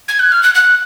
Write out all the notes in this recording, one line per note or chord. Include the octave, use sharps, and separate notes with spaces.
G#6
F#6
F6
F#6
F#6